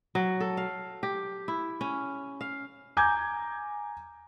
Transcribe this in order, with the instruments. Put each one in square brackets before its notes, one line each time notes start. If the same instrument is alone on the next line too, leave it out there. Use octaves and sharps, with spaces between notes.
[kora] F#3
A4
F5
G4
E4
C#4
F5
[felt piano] G#5 A#5 D6 G6 G#6